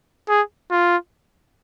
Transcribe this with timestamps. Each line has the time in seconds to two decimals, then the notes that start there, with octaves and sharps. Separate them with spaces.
0.29 G#4
0.71 F4